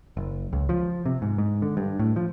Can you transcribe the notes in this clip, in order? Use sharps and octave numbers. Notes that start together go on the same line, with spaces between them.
F#1
C#2
F3
C3
G#2
G#2
D3
G2
A2
F3